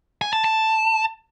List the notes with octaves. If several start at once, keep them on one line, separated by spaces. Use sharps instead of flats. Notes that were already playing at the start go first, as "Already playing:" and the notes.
G#5
A5
A5